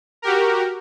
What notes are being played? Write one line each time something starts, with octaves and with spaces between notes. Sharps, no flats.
F#4 G4 A#4